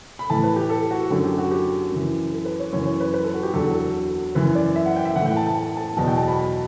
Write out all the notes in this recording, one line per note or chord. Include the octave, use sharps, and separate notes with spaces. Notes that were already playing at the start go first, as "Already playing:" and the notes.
B5
A2 E3 A5
B4
G4
A4
F#4
F#2 D3 F#3 F#4
G4
F#4
G4
F#2 E3
A4
B4
C#5
F#2 E3 C#5
C#5
B4
B4
A4
F#4
G4
E2 D3 F#3 A4
A4
F#2 E3 B4
D5
E5
F#5
G5
E5
A2 E3 F#5
G5
A5
A5
A5
A5
E2 B2 F#3 A5
G5
A5
B5